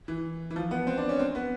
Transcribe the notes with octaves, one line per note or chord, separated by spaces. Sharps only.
E3
E3
F3
B3
C4
D4
C#4
C4
B3